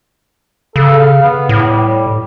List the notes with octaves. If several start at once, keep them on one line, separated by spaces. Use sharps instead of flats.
C#3 A4
F5
B3
A2
G3